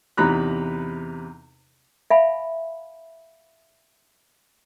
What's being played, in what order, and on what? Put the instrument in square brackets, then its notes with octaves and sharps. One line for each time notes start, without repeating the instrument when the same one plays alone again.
[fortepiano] E2 C3 D#4 A#5 B5 F#6
[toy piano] E5 F5 G#5 B5